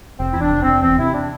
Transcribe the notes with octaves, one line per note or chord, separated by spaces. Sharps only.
F1 C4
E2 E4
D4
F1
F1 C4
E2 C4
C3 E4
D4